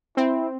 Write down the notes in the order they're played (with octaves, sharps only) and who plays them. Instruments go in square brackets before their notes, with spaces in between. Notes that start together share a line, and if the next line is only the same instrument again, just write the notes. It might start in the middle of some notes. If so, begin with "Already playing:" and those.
[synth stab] C4 [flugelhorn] E4